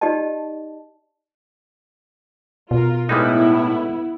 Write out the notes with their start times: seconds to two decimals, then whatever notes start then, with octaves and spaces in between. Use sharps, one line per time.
0.01 D#4 G4 D5 D#5 A5
2.71 B2 F4 A#4
3.09 A2 G3 G#3 B3 D#4 E4